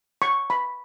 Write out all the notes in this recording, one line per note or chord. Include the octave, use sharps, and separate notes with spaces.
C#6
B5